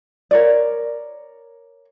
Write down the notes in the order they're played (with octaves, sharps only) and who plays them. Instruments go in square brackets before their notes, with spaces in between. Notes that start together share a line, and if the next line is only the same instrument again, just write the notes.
[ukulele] A#4 C#5 D5